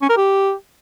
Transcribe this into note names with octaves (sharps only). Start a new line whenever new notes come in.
C#4
A#4
G4